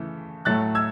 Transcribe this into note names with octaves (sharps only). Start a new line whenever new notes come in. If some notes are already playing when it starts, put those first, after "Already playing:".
Already playing: C#3 E3 A3
A2 F#3 A3 F#6 A6
E6 G#6